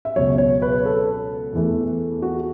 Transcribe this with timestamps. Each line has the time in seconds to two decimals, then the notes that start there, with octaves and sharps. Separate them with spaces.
0.05 E5
0.16 C#2 B2 F#3 C#5
0.38 C#5
0.62 B4
0.85 A4
1.53 E2 E3 A3
2.22 F#4